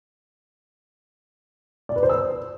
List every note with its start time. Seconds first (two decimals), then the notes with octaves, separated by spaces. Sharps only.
1.89 D5
1.96 B4
2.03 C5
2.09 E6